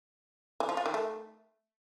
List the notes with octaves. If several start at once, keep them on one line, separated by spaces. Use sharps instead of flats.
E3
F3
F4
D#3
A3